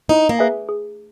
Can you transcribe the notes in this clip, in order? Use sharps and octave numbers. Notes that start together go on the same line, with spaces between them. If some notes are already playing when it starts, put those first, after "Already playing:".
D#4 E4
A#3
G#4 B4 E5 G#5
G#4